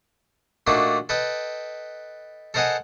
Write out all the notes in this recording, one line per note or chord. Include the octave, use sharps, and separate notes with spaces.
A#2 A3 A#3 D4 D#4 F#4
A4 B4 D#5 G5
A4 A#4 C5 D#5 F#5 G#5